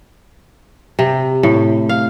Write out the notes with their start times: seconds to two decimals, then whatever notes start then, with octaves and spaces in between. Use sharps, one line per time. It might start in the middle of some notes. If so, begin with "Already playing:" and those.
0.99 C3
1.43 A2
1.89 F5